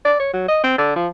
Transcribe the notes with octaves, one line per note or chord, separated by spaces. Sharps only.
D5
C#5
F#3
D#5
C4
D3
F3